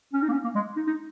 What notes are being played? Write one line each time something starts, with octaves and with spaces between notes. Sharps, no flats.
C#4
D#4
A#3
C#4
A#3
G#3
D#4
D#4